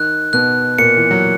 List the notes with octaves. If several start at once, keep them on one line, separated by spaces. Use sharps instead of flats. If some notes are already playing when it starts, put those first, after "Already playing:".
Already playing: D#3 D#4 F#6
B2 B3 F#6
A#2 A#3 C#7
E3
F#3